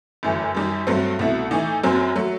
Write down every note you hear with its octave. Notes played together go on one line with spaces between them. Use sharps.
G1 F#2 E3 A3
F#2 D#3 G3 D#4 G4
G2 F#3 A3 C4
C2 B2 A3 E4
A2 E3 A3 D#4
F#1 F#2 F#3 C4
F#3 A3